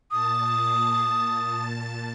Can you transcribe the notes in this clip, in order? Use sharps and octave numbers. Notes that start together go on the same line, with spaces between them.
A#2 A5 D#6 A6